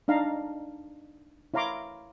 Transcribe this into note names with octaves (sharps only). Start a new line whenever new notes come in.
D4 D#4 F5 A5 A#5
E4 C#5 F5 A#5 C6 D6